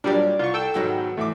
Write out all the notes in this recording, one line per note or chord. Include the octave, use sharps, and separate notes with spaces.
A#2 F#3 G3 D4 A#4 D5
C2 F4 C#6
A4 G5 E6
G#2 B2 D#3 F#3 B3 F#4
E2 A2 E5 D6